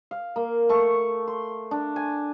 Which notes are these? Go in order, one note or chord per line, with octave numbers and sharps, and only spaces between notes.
F5
A#3
A3 C#6
C6
D4
G#5